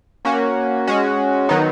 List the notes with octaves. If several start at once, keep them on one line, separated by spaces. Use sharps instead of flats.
A#3 C#4 F#4
G#3 C#4 F#4
D#3 F#3 B3 D#4